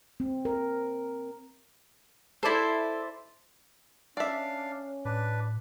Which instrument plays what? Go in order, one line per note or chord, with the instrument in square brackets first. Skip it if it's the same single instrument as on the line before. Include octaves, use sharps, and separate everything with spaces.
[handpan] C4
A#4
[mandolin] E4 C5 [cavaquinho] A4 D5
[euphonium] C#4 [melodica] D4 F5 [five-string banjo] D5 E5
[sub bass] A2 [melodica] D4 B4